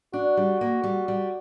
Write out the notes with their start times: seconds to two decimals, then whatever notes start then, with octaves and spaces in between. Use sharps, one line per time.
0.13 D4 F#4
0.37 G3
0.61 A#3
0.84 G3
1.08 G3